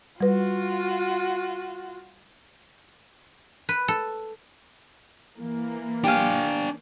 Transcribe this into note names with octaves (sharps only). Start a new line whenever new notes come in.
G3 F4 F#4 B4
B4
A4
E3 A#3
D4 G4 F5 G#5